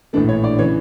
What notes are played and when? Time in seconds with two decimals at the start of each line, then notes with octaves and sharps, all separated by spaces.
0.13 A#1 A2 E3 A3 D4
0.29 C#5
0.44 D5
0.59 C#3 E3 C#5